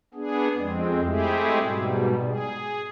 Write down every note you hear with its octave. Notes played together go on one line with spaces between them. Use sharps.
B3 D4 G#4
F2 G#3 C4
G#3 A3 C4 E4 G4 G#4
G#2 B2 G3
G#4